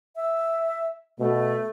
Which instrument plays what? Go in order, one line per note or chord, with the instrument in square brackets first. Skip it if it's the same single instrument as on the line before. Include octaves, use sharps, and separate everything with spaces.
[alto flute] E5
[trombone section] B2 [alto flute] A3